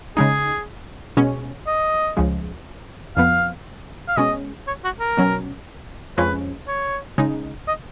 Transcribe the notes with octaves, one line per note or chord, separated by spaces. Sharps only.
C#3 G#3 D#4 G#4
B2 G#3 C#4
D#5
C#2 C#3 F3 G#3
F2 F3 B3 F5
F5
B2 G#3 C#4 D#5
C#5
F#4
A#4
B2 F#3 C#4
F2 F3 G#3 C#4 B4
C#5
C#3 G#3 D#4
D#5